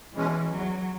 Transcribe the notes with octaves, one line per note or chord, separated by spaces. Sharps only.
B2 E3 G#3 C#4
E2 F#3